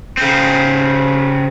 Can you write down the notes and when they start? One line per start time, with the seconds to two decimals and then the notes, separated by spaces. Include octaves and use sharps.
0.17 C#3 C4